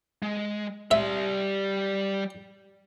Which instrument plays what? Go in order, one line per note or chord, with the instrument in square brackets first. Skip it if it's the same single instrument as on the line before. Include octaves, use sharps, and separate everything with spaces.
[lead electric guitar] G#3
[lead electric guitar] G3 C6 [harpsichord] E5